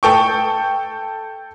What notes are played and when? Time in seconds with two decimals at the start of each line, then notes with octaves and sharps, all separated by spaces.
0.03 A4 G5 C#6